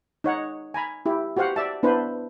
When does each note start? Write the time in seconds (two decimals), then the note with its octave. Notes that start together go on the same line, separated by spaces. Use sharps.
0.24 D#4 C#5 F#5
0.74 G#5 A#5 B5
1.06 E4 G4
1.37 F#4 G4 C5 F5 F#5
1.56 D5 E5 A5
1.83 B3 D4 E4 B4 C5